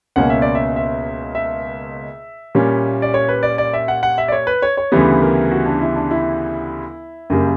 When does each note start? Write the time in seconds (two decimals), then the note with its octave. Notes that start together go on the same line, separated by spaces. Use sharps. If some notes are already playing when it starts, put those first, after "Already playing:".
0.16 C#2 B2 A#3 C#4 F#5
0.30 E5
0.42 D5
0.55 E5
0.76 E5
1.35 E5
2.55 A#2 G3 A#3 C#4
3.02 D5
3.14 C#5
3.29 B4
3.43 D5
3.58 D5
3.74 E5
3.88 F#5
4.03 F#5
4.18 E5
4.28 D5
4.32 C#5
4.47 B4
4.62 C#5
4.77 C#5
4.92 D2 C#3 E3 G3 B3
5.22 A#4
5.51 F#4
5.66 D4
5.82 E4
5.96 D4
6.11 E4
7.30 F#2 C#3 G3 A#3